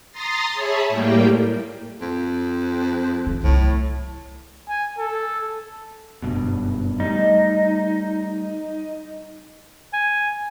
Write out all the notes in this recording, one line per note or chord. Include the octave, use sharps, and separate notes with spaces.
A#5 C6 D#6 A6 A#6 C7
G#4 C#5 E5 A5 B5
A2 G3 A#3 G5
F2
E3
C2 A2 F#3
G#5
A4
F#1 G2 B2
G3 A3 D#4
G#5